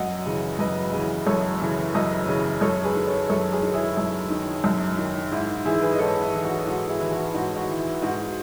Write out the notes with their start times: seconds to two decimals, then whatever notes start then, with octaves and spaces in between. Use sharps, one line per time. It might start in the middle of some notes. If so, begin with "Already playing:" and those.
Already playing: F#2 D#5 F#5
0.25 C#3 E3
0.59 F#2 B4 D#5
0.92 C#3 E3
1.26 F#2 A4 C#5
1.60 C#3 E3
1.94 F#2 B4 D#5
2.28 C#3 E3
2.61 F#2 A4 C#5
2.84 G#4 B4
2.96 D#3
3.07 A4 C#5
3.29 F#2 A4 C#5
3.52 G#4 B4
3.63 D#3
3.74 E4 G#4
3.97 F#2
4.30 D#3
4.64 F#2
4.97 D#3
5.32 G#2 E4
5.66 E3 E4 G#4
5.82 G#4 B4
5.92 D#5
5.99 G#2 A4 C#5
6.22 E4
6.33 E3
6.44 F#4
6.67 G#2 F#4
6.89 E4 G#4
7.01 E3
7.12 F#4
7.34 G#2 F#4
7.56 F#4
7.68 E3
7.79 E4
8.02 G#2 F#4